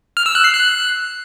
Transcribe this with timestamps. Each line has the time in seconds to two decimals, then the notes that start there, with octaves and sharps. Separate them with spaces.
0.17 F6
0.26 E6
0.35 F#6
0.44 C7
0.53 F#6